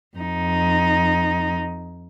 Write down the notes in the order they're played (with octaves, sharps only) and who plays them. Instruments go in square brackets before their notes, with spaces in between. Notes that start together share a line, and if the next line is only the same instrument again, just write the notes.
[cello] F2 D#4